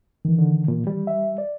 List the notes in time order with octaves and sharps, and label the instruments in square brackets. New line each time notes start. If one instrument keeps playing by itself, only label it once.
[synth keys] D#3 E3
[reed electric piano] D3
A#2
G3
[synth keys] E5
D5